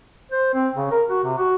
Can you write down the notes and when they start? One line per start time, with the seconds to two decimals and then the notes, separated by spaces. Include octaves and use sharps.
0.32 C5
0.54 C4
0.76 C#3
0.91 A#4
1.09 F#4
1.24 C3
1.37 F#4